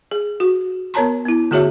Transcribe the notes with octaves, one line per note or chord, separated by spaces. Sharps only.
G#4
F#4
B3 A#4 C#5 A5 A#5 C6
B3 E4
D3 A3 F#4 G#4 C#5 E5